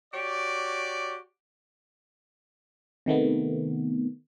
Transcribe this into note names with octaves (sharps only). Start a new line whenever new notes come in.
F#4 G4 C#5 D5
C3 D#3 A3 B3